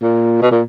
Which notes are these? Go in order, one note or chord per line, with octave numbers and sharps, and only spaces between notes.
A#2
B2
A#2